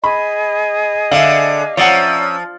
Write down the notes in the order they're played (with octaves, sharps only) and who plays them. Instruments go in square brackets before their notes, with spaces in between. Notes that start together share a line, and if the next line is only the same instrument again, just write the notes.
[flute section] G#4 D#5 [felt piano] B5
[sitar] D3 [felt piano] E5 F5
[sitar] F3 [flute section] C#4 A#5 E6 [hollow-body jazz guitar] C#5 D5 F#5